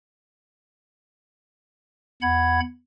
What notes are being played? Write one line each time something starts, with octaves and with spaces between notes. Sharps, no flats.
E2 F#5 B5 G#6